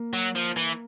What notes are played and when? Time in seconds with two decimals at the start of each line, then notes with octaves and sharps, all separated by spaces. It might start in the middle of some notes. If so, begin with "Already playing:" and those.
Already playing: A#3
0.13 F#3
0.35 F3
0.56 E3